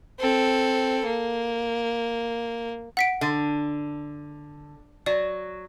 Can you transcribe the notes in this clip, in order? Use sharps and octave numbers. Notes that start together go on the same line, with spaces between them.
C4 A4
A#3
F#5 B6 D7
D3
F#3 D5